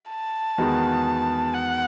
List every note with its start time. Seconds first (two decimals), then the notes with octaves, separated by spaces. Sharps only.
0.10 A5
0.58 E2 D#3 G#3 B3 F#4
1.53 F#5